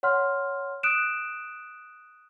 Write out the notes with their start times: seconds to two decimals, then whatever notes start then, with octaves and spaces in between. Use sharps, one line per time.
0.03 C#5 F#5 C6 F6
0.83 D#6 F#6 D7 E7